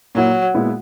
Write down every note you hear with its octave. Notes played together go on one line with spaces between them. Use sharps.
A#2 F#3 A#3 E4
A#2 G#3 B3 E4